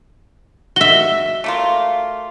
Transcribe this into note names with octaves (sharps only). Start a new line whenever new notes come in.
F#4 E5 G7
A3 A#3 F4